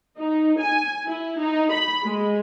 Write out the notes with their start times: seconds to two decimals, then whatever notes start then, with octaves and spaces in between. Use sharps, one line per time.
0.18 D#4
0.59 G#5
1.08 E4
1.39 D#4
1.72 B5
2.04 G#3